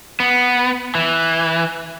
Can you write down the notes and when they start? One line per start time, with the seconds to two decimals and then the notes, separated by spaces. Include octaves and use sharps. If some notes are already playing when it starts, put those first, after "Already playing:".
0.20 B3
0.95 E3